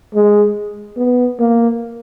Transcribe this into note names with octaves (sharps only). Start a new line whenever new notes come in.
G#3
B3
A#3